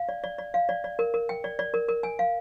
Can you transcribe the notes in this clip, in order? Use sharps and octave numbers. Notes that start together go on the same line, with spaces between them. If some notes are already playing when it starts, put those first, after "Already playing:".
Already playing: F5
D5
D5
D5
F5
D5
D5
A#4
A#4
G5
D5
D5
A#4
A#4
G#5
F5